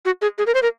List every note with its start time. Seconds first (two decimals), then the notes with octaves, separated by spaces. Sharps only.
0.05 F#4
0.22 G#4
0.38 G#4
0.47 A#4
0.55 C5
0.62 A#4